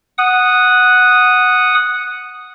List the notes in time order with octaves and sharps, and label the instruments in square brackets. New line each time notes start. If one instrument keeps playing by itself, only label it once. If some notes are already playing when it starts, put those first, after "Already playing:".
[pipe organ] F#5 D#6